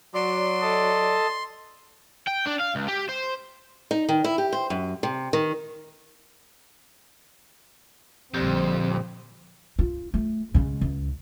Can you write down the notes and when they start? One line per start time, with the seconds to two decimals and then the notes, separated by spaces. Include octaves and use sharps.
0.15 F#3 D5 C6
0.61 A4 D#5 A5
2.28 G5
2.47 D4
2.61 F5
2.76 C#2
2.89 G4
3.09 C5
3.91 D#4
4.09 D#3
4.24 E4
4.38 G4
4.53 C5
4.70 F#2
5.03 C3
5.33 D#3
8.34 A#1 F2 D3 G3 C4 G4
9.79 F4
10.14 A3
10.54 C#3 G#3
10.81 C#2